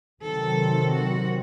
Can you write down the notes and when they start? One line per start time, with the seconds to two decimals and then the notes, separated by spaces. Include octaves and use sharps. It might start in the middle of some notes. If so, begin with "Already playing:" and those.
0.22 C3 D#3 F#3 C4 A4
0.91 F#4